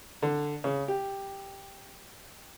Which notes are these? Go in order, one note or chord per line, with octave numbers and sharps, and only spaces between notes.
D3
C#3
G4